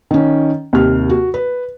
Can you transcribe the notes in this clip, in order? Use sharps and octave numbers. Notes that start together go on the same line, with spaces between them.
D#3 C#4
D#2 C3 F6
F#4
B4